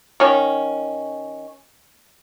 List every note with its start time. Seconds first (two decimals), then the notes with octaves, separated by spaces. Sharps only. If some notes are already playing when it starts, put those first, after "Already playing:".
0.20 D#3 C#4